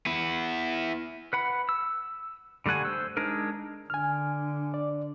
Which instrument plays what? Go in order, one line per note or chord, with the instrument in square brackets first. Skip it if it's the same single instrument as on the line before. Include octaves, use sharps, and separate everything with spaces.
[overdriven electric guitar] B3 E4
[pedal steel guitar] B4 F#5 B5
E6
D3 G3 A3 F#5 G#5
C5 E6
G#3 D4 D#4 A#4
[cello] D3 [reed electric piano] G#5 F6
[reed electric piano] D5